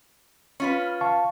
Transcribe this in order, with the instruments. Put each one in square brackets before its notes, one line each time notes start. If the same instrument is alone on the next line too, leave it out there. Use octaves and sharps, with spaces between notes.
[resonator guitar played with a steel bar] C#4 F4 B4
[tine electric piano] F5 A5 C#6